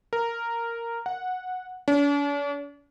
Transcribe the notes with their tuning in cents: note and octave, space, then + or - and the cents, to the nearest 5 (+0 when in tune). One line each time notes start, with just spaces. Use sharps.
A#4 -5
F#5 -10
D4 -45